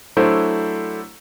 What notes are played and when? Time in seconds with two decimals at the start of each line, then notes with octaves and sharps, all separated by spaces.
0.17 F#3 A3 D4 E4 C5